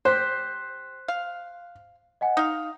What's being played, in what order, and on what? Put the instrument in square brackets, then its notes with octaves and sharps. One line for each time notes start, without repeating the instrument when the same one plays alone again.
[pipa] G4 [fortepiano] C5 [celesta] F#6 B6
[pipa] F5
[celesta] D#5 F#5 G#5
[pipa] D#4 F5 [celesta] D#6